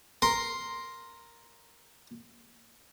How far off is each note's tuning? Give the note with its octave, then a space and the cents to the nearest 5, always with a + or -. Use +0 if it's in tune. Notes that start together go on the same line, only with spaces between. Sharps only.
A#4 +0 C6 +0